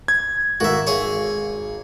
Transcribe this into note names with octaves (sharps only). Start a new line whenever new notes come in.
G#6
G#1 F#4 A#4 E5
G#4 C#5